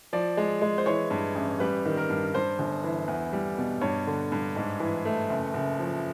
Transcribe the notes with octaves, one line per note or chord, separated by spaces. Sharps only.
F3 D5
G#3
G#3
C5
E3 C#5
G2
A1
G3 B4
D#3
A#4
G2
G2 C5
G1
E3
E2
G3
B2
G2 C#5
D3
G2
G#2
E3
A3
F#1
F#1
F3